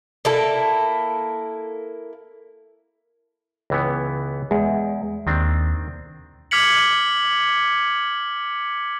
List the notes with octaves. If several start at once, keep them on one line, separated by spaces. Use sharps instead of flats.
A#3 E4 A4
C#2 E3 B3
E2 G#3
D#2 D#3 C4 D4
D6 F6 G#6 B6 C#7 F#7